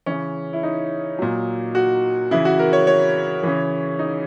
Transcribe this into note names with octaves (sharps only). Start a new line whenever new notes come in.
C#3 E3 C#4
E4
D#4
A#2 F#3
F#4
C#3 E3 E4
F#4
A#4
C#5
C#5
C#3 E3
D#4